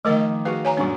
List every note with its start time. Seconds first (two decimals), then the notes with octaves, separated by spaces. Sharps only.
0.05 D#3 F3 A3 A#4 D#5 D6
0.45 F#4 G#4 B4 F5
0.65 C#5 G#5 A#5
0.77 F#2 A#2 G3 C#4 D4